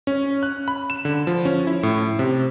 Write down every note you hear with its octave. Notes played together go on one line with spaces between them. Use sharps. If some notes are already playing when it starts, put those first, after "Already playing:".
C#4
F#6
B5
E7
D3
F3
C#4
E4
A2
C3